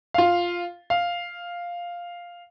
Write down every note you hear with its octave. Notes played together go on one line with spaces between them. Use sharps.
F4 F5
F5